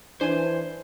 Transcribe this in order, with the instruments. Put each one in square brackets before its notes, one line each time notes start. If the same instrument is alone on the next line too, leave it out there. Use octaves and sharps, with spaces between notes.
[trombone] E3 [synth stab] D4 G#5 [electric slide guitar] C5